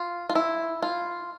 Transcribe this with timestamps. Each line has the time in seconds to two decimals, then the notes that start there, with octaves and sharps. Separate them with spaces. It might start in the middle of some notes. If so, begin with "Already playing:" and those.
Already playing: F4
0.29 F4
0.35 E4
0.82 F4